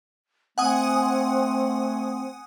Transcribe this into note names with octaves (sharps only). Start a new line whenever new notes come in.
A3 C4 F#5 G#5 D#6